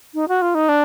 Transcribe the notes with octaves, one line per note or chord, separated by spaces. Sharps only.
D#4
F#4
F4
D#4
D4